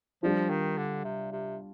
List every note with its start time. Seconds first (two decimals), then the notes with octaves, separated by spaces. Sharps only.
0.23 F3 G3 D4 F4
0.50 D#3
0.77 D3
1.04 C3
1.32 C3